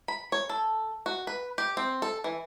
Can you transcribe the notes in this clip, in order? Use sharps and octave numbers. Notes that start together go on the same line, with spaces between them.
B5
C#5
A4
F#4
B4
G4
C4
A4
E3